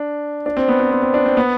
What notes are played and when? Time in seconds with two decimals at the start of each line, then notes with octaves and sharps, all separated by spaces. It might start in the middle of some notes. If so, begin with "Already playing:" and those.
Already playing: D4
0.46 D4
0.57 C4
0.68 B3
0.80 C4
0.91 C4
1.02 C4
1.14 D4
1.26 C4
1.37 B3